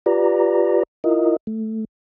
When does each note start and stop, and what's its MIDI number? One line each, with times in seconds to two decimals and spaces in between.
0.06 0.83 65
0.06 0.83 67
0.06 0.83 71
0.06 0.83 74
0.06 0.83 82
1.04 1.36 64
1.04 1.36 65
1.04 1.36 70
1.04 1.36 75
1.47 1.85 57